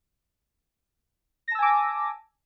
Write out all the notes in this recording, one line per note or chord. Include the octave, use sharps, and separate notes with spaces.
G#5 A5 D6 E6 A#6